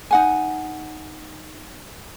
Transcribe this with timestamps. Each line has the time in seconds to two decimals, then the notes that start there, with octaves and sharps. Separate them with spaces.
0.11 D#4 F#5 G#5